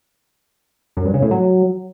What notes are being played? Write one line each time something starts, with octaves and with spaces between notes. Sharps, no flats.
F#2
G2
C#3
A2
F#3